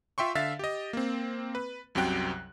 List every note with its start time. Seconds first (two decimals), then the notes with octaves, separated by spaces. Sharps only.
0.18 F4 E5 G5 C6 C#6
0.35 D3 E5 F5 A6
0.59 G4 D#5
0.93 A#3 C4
1.55 B4
1.95 C2 F#2 C3 F#3 G5 F#6